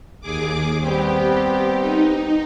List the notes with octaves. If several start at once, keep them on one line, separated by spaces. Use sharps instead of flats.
D#2 G#4 D6
G3 B3 C4 G4
D#4